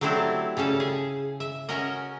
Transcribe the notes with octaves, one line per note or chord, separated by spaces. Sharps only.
F#3 A3 C4 D4 E4 G4
C#3 G3 C#4 A4
G#4
E5
C#4 F#4 A#4 D#5